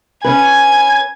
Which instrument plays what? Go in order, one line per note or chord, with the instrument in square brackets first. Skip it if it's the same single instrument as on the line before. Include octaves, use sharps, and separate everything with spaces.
[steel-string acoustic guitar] C#4 B4 [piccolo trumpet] G#5 [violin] G#6